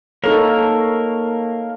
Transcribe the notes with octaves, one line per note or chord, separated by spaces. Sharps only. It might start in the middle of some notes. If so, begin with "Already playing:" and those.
A#3 D#4 A4 A#4 C#5